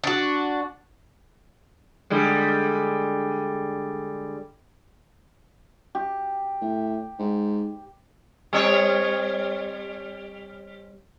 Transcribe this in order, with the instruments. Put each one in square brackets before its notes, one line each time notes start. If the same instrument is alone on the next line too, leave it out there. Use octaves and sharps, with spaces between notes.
[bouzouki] D4 F#4
[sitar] D3 G3 G#3
[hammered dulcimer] G4
[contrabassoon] A2
G#2
[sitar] G3 C4 C#5